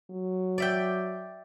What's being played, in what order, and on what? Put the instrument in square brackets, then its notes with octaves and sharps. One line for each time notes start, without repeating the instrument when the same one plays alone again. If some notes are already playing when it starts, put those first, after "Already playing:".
[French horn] F#3
[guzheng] D5 E5 G5